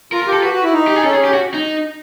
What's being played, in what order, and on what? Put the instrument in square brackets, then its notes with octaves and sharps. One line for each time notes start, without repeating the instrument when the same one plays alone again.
[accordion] F4 [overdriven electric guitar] A#4
[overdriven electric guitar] A#4
[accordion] G4
[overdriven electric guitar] A4
[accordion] F#4 [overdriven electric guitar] B4
[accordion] F#4
E4
D#4
[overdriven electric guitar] G4
G#4
[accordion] C#4 [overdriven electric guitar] A4
[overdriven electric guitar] G#4
[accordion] C#4 [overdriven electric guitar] G4
[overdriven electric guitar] F#4
D#4